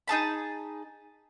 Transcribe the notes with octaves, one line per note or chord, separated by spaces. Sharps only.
D#4 G#4 A5 B5